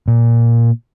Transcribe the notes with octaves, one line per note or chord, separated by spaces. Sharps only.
A#2